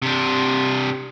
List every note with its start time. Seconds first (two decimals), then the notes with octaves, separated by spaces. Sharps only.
0.02 C3 D4